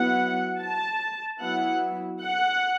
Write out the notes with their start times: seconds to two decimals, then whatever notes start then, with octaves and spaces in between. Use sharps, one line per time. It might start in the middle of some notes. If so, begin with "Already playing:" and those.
Already playing: F#3 B3 E4 F#5
0.60 A5
1.40 F#3 B3 E4 F#5
2.22 F#5